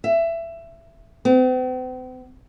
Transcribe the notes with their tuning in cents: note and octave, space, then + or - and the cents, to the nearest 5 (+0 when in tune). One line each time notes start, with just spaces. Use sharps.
E5 +20
C4 -45